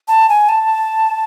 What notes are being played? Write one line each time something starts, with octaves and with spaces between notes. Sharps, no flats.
A5
G#5
A5